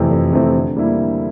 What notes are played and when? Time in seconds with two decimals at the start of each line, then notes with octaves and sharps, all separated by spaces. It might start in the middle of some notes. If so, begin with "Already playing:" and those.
Already playing: F2 C3 E3 A3 C4
0.11 F2
0.33 C3 E3 A3 C4
0.55 D3
0.76 G3 A#3 E4
0.97 D3